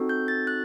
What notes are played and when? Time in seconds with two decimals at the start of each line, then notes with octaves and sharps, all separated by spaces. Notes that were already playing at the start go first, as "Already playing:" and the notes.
Already playing: C4 D#4 F#4 A4
0.09 G6
0.28 A6
0.47 F#6